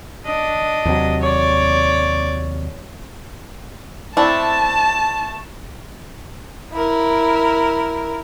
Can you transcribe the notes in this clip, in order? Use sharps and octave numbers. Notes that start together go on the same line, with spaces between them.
D4 D#5
D#2 C3 F#3
C#5 D5
A3 C4 D4 E4 A5
E4 A#4